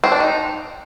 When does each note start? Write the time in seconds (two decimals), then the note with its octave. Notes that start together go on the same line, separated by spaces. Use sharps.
0.04 C4
0.12 D4
0.20 D#4